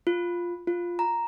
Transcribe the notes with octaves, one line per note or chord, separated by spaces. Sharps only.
F4
F4
A#5